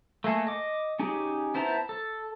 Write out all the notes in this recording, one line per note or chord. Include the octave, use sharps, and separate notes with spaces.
A3 A#3 G#4 A4
D#5 D6
C#4 D#4 G4 G#4
B3 E4 C5 A5 A#5
A4